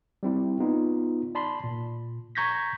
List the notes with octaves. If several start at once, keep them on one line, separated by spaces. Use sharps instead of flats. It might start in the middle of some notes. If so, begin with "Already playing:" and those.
G3 C4 E4
B3 D#4 F4
D5 A5 B5 C6
A#2
A#5 C#6 G6 G#6 A#6 B6